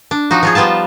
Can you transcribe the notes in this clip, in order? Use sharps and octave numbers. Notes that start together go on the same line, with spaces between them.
D4
F3 D#4 F#4
F3 F4 G#4
F3 G3 B3 F4 A5